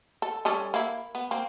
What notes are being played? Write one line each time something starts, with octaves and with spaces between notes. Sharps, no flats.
A4
G3 C#4 A4
A#3 E4
B3
A#3 C4